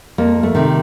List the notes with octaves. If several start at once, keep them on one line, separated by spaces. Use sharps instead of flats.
F2 A#3
A3
C3 D#3